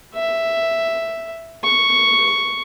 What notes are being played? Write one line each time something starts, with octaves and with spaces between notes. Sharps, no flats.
E5
C#6